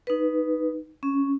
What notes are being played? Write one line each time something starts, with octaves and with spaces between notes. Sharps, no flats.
D#4 B4
C#4